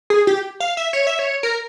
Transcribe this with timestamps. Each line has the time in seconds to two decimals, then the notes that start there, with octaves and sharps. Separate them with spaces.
0.10 G#4
0.27 G4
0.60 F5
0.77 E5
0.93 C#5
1.07 E5
1.19 C#5
1.43 A#4